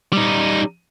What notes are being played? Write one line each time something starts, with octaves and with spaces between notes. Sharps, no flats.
G3 D#4